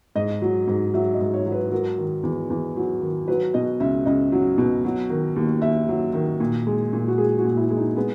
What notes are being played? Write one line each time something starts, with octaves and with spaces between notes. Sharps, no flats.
G#2 D#5
F#3
G#2
F#3 E5
D#5
G#2
C#5
F#3
B4
F#3 A#4
D#3
E2
E2
F#3
D#3
F#3 B4
B2 D#5
C#2 E5
C#2 D#5
F#3
B2
F#3
D#3
D#2
D#2 E5
F#3
D#3
A#2
G#3
A#2
F#4
G#3 G#4
F#4
A#2
E4
G#3
D#4
G#3 B3